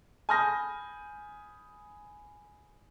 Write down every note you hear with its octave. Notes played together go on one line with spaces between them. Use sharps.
G#5 B5 D#6 F6 G6 A#6